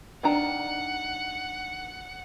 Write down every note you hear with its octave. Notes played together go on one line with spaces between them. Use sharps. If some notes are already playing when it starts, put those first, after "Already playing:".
D#3 D4 F#5 A#5